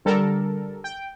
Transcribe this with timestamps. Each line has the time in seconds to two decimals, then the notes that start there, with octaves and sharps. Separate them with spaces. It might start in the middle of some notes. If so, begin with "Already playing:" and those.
0.05 D3 G3 A4 A#4
0.84 G5